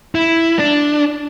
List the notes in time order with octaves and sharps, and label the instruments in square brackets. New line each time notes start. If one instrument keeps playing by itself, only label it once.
[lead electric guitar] E4
D4